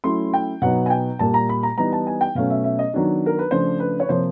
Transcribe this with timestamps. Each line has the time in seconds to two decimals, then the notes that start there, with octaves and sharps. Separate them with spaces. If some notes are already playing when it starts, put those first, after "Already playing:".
0.04 F#3 A3 C#4 E4 C6
0.34 G5
0.62 B2 F#3 B3 D#4 F#5
0.86 G#5
0.90 G5
1.19 A#2 G3 A#3 A5
1.34 A#5
1.49 B5
1.63 A#5
1.78 E3 G3 B3 D#4 A#5
1.93 A5
2.07 G#5
2.21 G5
2.35 B2 F#3 A3 C#4 F5
2.50 E5
2.64 E5
2.79 D#5
2.94 D#3 F#3 B3 D4
3.26 A#4
3.39 B4
3.51 C#3 F3 A3 D4 C5
3.80 B4
4.00 C#5
4.09 C3 F3 A#3 C5